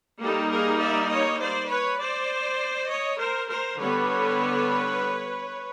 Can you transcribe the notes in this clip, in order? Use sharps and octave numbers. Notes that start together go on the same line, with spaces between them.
G3 A#3 D#4 G4 A4
G#4 A#4
D5 E5
C#5 D#5
C5 D5
B4 C#5
C5 D5
C#5 D#5
A#4 C5
A#4 C5
D3 G3 B3 B4 C#5